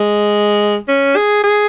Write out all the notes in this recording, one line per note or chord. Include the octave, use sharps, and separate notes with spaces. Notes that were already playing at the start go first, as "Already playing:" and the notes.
Already playing: G#3
C#4
G#4
G#4